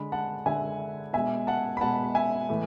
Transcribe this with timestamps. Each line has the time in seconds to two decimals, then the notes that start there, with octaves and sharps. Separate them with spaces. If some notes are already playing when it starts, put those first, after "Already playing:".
Already playing: D3 G#3 B5
0.12 F#5 A5
0.46 D3 G#3 E5 G#5
1.13 B2 G#3 E5 G#5
1.47 F#5 A5
1.77 B5
1.81 B2 G#3 F#5 A5
2.15 E5 G#5
2.49 A2 E3 A3